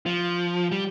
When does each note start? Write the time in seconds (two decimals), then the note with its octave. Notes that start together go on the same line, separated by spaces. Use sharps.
0.06 F3
0.72 G3